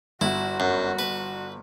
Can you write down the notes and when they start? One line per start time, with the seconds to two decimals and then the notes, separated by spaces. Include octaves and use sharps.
0.21 G1 E4 F#4
0.60 F#2
0.99 B4